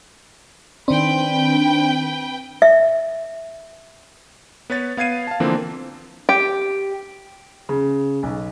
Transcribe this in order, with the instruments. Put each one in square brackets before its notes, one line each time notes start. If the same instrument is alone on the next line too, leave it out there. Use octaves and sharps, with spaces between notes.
[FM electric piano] D#3 D4 [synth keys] C4 [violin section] B4 G5
[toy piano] E5
[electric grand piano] B3 B4 C#5 A6
B3 F5 G#6 C7 D#7
F5 A5
D3 E3 F3 A#3 C4
[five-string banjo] G4
[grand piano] C#3
B1